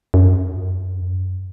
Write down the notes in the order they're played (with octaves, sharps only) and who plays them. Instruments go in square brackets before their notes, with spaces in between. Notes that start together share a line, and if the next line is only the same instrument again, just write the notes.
[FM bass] F#2